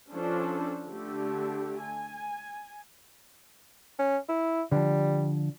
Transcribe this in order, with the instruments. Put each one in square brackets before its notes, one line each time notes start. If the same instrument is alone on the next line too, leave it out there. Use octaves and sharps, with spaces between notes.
[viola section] F3 C#4 D4 A4 C5
D3 A3 G4
G#5
[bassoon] C#4
E4
[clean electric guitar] D3 F3 [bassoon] G3